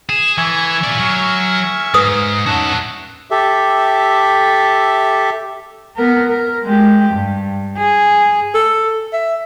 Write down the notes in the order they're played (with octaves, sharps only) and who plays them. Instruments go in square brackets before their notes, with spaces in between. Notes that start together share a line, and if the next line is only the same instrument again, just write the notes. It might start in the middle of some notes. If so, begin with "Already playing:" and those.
[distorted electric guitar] G#4 [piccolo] E7
[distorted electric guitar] E3 [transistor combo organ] E5 G#5 C#6 [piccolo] G#6
[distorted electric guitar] F4 D5
[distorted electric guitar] F#3 [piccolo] F6
[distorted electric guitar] G#2 [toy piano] B4 D#6
[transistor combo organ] C#4 D#4 F#5 [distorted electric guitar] F#4 E5 [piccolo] A5
[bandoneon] G4 A4 E5
[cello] B3 A#4
A#4
G#3 G4
G2
G#4
[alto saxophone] A4
E5